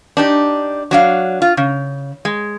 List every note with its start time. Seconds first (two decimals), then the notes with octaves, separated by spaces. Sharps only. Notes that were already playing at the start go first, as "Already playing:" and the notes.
0.17 D4 D#4 G4
0.91 F#3 D4 F5
1.42 F4
1.57 C#3
2.25 G#3